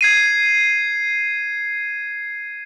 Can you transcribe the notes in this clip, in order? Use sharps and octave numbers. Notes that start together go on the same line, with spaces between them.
G#6 C7 D#7